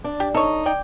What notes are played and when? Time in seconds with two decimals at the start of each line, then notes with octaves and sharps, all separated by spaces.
0.04 D4
0.20 G4
0.35 D#4 A4 C#5
0.66 D5 G5